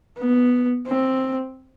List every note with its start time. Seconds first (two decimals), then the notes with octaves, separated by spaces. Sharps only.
0.19 B3
0.87 C4